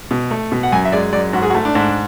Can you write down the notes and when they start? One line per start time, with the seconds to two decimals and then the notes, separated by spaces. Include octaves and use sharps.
0.11 B2
0.31 A3
0.52 B2
0.63 F#5
0.72 F#2 G#5
0.85 E5
0.92 G#3 D5
1.13 F#2 D5
1.33 G#2 F#4
1.42 G#4
1.50 F#4
1.54 A3
1.65 D4
1.75 G#2